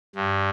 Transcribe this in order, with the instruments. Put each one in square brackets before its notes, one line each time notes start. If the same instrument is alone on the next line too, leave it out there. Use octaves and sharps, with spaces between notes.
[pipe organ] G2